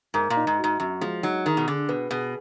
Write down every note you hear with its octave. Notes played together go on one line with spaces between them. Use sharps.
G#2 A#4
A#2
D#4
G#2
F#4
G#2
F#2 F#4
F3 G#3
F#3 D#4
D#3 G#4
B2
D3 G#4
B2 B4
B2 G#4